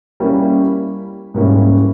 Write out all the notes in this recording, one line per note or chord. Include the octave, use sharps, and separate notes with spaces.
G3 A#3 C#4 E4 G4
G#2 G3 A#3 C#4 E4